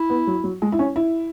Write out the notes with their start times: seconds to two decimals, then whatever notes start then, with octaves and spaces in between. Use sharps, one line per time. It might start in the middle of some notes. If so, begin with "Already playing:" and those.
Already playing: E4
0.10 B3
0.27 F#3
0.44 F#3
0.62 G#3
0.72 E4
0.79 C#4
0.96 E4